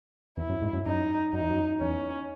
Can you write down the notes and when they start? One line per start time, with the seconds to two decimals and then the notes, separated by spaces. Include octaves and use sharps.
0.37 E2 E4
0.49 F#2
0.62 G#2
0.73 F#2
0.85 F#2 D#4
1.33 F#2 D#4
1.41 E2
1.50 F#2
1.81 E2 C#4